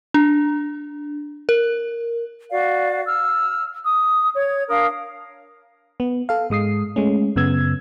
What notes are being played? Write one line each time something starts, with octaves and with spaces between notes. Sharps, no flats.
D4
A#4
F#4 D5 F5
E6 F6
D#6
C#5 G#6
D4 A#4 F5 D#6
B3
A4 F5
G#2 G#3 D#6 C7
G#3 A3 C#4
F#2 C#3 B3 E6 G#6